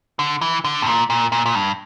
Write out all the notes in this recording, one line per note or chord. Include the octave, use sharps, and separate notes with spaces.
D3
E3
D3
G2
A#2
A#2
A#2
A#2
G2